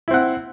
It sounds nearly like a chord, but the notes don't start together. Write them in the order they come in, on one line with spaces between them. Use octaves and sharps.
E4 C4 F#5